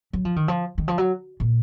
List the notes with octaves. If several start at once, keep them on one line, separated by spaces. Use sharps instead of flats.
F#3
F3
D#3
F3
D#3
F3
F#3
A#2